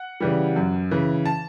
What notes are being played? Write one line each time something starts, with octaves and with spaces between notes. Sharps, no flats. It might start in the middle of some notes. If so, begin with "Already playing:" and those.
Already playing: F#5
C#3 E3 G3
F#2
C#3 E3
A5